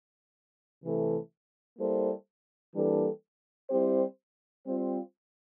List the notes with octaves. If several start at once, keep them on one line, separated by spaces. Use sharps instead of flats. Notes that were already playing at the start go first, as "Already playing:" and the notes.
C3 E3 A3 E4 A4
G3 A#3 E4 A4 C5
E3 G3 A#3 D4 A4
G3 C4 E4 G4 C5
G3 C4 F4 C5